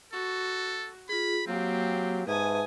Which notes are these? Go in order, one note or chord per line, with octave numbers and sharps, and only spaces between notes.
F#4 A4
F4 G#4 B5
F#3 A#3 C4 G4 F5
G#2 B4 E5 G#5 A5 D#6